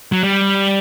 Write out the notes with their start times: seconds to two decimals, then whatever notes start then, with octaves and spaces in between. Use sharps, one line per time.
0.12 F#3
0.23 G3